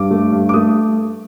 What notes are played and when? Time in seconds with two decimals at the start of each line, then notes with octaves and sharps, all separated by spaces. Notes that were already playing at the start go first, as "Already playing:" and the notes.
Already playing: G2 D6
0.11 A3
0.32 G2
0.49 D6
0.54 A3 D#6